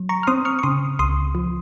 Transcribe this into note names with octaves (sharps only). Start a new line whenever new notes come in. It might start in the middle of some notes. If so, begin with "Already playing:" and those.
Already playing: F#3
A#5 C#6
F6
C4 C6 D#6
C#6 F6
C#6
C#3 C6 D#6
C#2 C6 D#6
F3